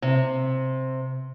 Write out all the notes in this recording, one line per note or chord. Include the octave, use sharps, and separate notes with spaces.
C3